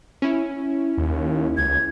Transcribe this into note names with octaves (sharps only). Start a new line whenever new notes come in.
C#4 E4
D#2
C#2 G#6